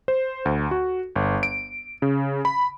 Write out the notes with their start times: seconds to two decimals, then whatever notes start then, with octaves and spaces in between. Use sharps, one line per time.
0.08 C5
0.45 D2
0.71 F#4
1.16 G1
1.43 D7
2.02 C#3
2.45 B5